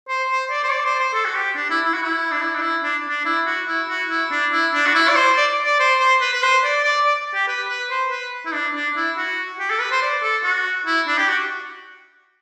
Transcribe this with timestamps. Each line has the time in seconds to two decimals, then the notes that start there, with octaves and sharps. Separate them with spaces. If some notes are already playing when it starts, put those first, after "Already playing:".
0.08 C5
0.30 C5
0.50 D5
0.64 C5
0.71 D5
0.85 C5
1.00 C5
1.14 A4
1.25 F#4
1.35 G4
1.56 D4
1.70 E4
1.85 E4
1.93 F#4
2.03 E4
2.31 D4
2.41 E4
2.55 D4
2.62 E4
2.83 D4
3.09 D4
3.25 E4
3.46 F#4
3.67 E4
3.89 F#4
4.10 E4
4.31 D4
4.52 E4
4.73 D4
4.86 F#4
4.95 E4
5.09 D5
5.16 C5
5.36 D5
5.65 D5
5.79 C5
6.00 C5
6.21 B4
6.33 B4
6.42 C5
6.64 D5
6.84 D5
7.06 D5
7.34 G4
7.48 B4
7.69 B4
7.90 C5
8.11 B4
8.45 E4
8.53 D4
8.74 D4
8.96 E4
9.17 F#4
9.59 G4
9.70 A4
9.80 B4
9.92 C5
10.02 D5
10.22 A4
10.44 F#4
10.86 E4
11.07 D4
11.18 G4
11.28 F#4